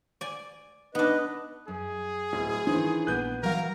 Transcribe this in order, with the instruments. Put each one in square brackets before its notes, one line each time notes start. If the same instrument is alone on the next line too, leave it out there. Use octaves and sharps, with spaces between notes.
[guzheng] D5 G#5
[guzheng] B3 D4 [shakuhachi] D#4 [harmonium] B4 D#5
[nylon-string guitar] F#2 [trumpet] G#4
[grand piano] D1
[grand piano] D#3 E3 [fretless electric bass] D4 [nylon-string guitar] C5
[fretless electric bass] A#1 [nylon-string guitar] B3 D4 B4 [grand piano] F#6 G6 D#7
[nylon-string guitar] E3 F#3 F5 [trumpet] A#4